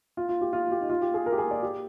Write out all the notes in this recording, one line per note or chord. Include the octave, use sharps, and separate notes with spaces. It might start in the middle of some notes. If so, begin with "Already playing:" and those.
F4
F4
G4
F4
G4
D#4
F4
G4
G#4
A#4
G4
G#4
D5
G4